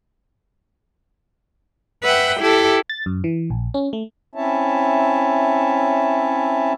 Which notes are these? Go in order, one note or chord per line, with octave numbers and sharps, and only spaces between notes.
B4 E5 F#5 G5
E4 G4 A4
A6
F#2
E3
A#1
C#4
A3
C4 C#4 E4 C#5 E5 A5